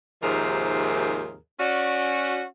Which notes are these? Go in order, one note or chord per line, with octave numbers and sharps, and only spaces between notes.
D#2 G#2 C3 F3 G#4 A#4
C#4 F#4 D5